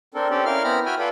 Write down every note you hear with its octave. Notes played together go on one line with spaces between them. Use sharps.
C4 D4 A4 A#4
C4 C#4 G4 A4 D5
C#4 E4 A#4 D5 F5 F6
B3 C4 E4 A#5 B5 F6
F#4 E5 G5 G#5 B5 F6
F4 A4 B4 D5 B5